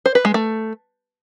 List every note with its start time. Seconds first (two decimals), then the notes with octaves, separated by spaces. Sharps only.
0.06 C5
0.15 B4
0.25 G#3
0.34 A3